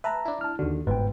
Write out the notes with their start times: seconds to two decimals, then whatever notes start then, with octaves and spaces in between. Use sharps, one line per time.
0.04 B4 E5 A5 A#5
0.25 D4 E4
0.41 A5 F6
0.59 D#2 D3 F#4
0.87 G1 G#2 B2 B4 G5